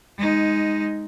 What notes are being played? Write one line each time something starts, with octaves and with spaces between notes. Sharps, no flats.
G#3 D#4